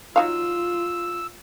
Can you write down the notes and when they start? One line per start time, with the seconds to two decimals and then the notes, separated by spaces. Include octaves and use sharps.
0.16 F#3 D#4 F4 F5 E6